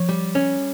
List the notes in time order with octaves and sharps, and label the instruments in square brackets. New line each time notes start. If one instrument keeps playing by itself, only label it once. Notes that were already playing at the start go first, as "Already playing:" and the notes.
Already playing: [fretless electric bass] F3 [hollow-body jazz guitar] C#5
[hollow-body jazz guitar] G3
C#4